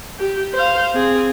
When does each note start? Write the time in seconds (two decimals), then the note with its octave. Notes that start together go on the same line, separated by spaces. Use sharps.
0.19 G4
0.54 C5 F5
0.95 C4 G#4